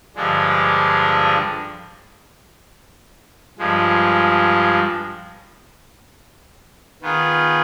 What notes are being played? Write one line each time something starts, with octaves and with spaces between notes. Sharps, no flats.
G2 D3 F3 G#3 D4
G2 F3 G#3
D#3 B3 F4 G#4